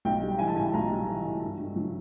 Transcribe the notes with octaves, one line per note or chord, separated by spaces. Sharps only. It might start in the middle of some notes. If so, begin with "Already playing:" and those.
B1 G5
G3
E3 G#5
A5
A2 G#5
B1 A#5
G3
E3
A2
G2
G2
F#3